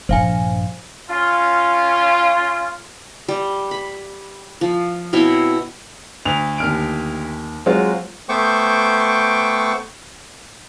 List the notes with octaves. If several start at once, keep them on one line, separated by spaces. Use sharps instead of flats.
A#1 G2 C5 F5 G#5
C#4 F4
G3
B5
F3
B2 C4 E4 C#5
D2 F7
D#2 F6 D7
F#3 G#3 C4 F4 F#4
A3 B3 C5 G5 C#6 D6